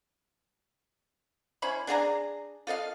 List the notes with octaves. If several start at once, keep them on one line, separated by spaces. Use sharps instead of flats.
C#4 E4 C5 B5
D4 G#4 F5 A#5
F4 A4 D#5 F5